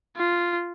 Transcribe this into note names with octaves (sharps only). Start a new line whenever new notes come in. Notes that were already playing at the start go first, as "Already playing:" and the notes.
F4